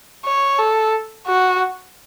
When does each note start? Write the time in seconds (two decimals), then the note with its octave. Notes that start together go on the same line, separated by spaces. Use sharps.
0.25 C#5
0.59 A4
1.27 F#4